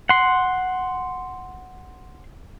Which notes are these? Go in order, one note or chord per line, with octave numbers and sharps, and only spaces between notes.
F#5 C6